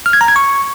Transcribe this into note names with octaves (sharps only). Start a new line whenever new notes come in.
F6
G#6
A#5
G#6
C#6